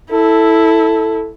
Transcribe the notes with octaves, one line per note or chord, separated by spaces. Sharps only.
E4 A4